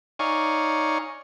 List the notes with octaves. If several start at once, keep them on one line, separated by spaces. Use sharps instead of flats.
D#4 C#5 D5 F5 G#5 C#6